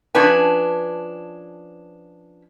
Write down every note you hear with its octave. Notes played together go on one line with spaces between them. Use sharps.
F3 C#4 D4 B4 G#5